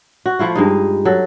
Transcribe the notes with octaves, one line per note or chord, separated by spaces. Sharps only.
F#4
F3 A3 E4 F4
G2 G#3 D#4
F#3 A4